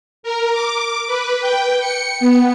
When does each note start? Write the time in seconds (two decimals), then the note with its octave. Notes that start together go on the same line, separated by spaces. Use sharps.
0.23 A#4
0.52 D6
1.07 B4
1.41 G5
1.80 C#7
2.20 B3